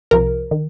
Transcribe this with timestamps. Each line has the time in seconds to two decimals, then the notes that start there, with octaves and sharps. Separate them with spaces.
0.11 C2 C3 F3 A#4
0.51 D#3